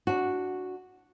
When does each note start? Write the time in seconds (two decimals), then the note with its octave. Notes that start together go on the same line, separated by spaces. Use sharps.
0.07 D4 F#4